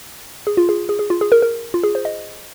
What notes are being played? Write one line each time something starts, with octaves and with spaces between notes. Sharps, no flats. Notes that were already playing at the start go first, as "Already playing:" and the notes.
G#4
F4
G#4
G#4
G#4
F4
G#4
A#4
A#4
F4
G#4
C5
D#5